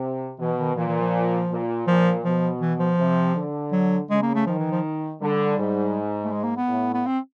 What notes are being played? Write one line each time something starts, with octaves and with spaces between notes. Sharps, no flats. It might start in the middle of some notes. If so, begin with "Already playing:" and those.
Already playing: C3
B2 E3
D#3
A#2 E3
E3
F3
A#2
A#2 F3
B2 F3
E3
F3
C3
D3
F#3
C#3 G#3
A#3
A3
D#3 F3
E3
F3
D3 G3
G#2
A3
G#3
A#3
B3
A2
B3
C4